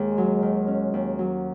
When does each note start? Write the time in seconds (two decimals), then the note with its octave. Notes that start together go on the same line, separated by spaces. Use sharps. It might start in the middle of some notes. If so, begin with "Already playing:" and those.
Already playing: D#2 G#3
0.18 F#3
0.42 D#3
0.68 C#4
0.94 D#2
1.19 F#3